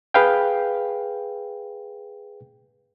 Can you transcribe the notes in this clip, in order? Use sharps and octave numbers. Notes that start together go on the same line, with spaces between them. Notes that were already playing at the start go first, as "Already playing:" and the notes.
G#4 B4 F5 G5